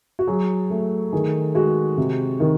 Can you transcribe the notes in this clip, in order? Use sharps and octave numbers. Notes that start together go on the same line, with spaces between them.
F#4
F#3 G#4
A3
D#3 G#4
G#3 F#4
C3
D#3